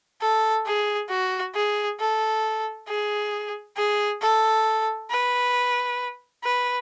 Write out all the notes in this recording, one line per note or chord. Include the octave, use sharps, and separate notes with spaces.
A4
G#4
F#4
G#4
A4
G#4
G#4
A4
B4
B4